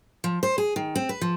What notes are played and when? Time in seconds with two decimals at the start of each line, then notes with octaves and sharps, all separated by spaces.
0.24 F3
0.43 C5
0.58 G#4
0.76 D#3
0.96 C4
1.09 B4
1.21 F3